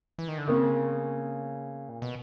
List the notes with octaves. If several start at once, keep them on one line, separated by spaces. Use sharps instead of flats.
E3
D#3
D3
C#3 A#3 C4
A#2
B2